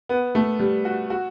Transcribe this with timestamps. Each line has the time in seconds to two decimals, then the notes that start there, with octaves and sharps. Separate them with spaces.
0.09 B3
0.35 A3
0.60 G3
0.85 F#4
1.10 F#4